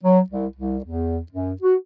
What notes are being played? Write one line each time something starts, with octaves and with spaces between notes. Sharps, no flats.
F#3
C2
C2
E2
F#2
F#4